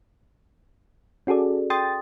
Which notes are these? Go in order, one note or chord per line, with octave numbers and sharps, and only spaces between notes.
C#4 F#4 G#4 A4 D5
G5 C6 D#6 A6